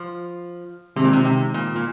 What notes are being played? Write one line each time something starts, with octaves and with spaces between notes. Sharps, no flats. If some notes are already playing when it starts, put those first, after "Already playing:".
Already playing: F3
C3 D#3 G#3 C4 D#4
A#2
C3
C3
A#2
A#2